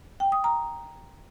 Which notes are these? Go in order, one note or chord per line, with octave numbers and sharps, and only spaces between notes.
G5
D#6
A#5